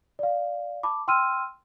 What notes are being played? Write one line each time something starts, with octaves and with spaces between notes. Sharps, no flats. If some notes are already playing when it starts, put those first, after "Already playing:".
D5 F5
A5 B5 D6
G5 C6 E6 F6 D#7